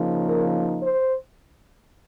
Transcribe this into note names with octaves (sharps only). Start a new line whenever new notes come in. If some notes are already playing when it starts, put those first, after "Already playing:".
Already playing: C#3 F3 A#3 D#4
A#4
C5